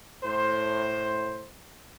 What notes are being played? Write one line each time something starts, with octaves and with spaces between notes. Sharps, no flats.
A2 C5